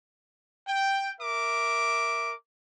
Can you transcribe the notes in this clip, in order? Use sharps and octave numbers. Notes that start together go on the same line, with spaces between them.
G5
A#4 E5 D6